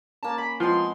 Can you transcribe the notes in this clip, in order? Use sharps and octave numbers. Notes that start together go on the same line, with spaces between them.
A#3 C#4 A5
A#5 B5
F3 G#3 B3 C4 C6